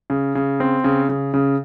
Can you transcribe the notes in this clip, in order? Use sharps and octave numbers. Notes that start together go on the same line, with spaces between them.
C#3
C#3
C4
C#3
C#3
C#3